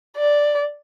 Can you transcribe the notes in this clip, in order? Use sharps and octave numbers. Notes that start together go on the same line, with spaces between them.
D5